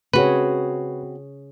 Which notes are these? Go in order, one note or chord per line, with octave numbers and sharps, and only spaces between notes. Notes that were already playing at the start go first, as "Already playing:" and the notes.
C#3 C4 F#4 G#4 B4 C#5